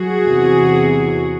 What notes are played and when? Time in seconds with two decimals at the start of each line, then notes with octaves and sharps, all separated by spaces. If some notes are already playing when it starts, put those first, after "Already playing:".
Already playing: F#3 F#4 G#4
0.24 E2 C3 E3